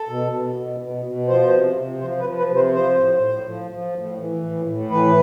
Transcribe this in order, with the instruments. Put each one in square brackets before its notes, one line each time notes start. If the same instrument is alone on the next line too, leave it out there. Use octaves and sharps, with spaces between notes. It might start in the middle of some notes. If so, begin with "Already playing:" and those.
Already playing: [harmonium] A4
B2
B2
B2
B2
B2
F3 C5
C3
C3
F3 C5
B4
F3
B4
C3
C5
F3 C5
A2
A2
F3
F3
A2
E3
A2
A2
E3 B4